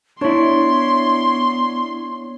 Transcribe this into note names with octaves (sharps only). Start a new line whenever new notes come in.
B3 D4 E4 C#5 C6